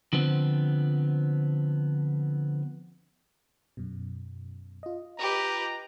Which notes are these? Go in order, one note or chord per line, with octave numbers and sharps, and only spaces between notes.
D3 F3 B3 C4
F#2 B2
F4 D#5
G4 B4 A#5